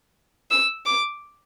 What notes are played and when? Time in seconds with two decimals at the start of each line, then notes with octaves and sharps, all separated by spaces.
0.51 E6
0.86 D6